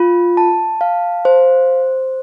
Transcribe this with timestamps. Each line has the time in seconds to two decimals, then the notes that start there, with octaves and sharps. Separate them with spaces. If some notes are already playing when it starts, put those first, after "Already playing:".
Already playing: F4
0.37 A5
0.81 F5
1.25 C5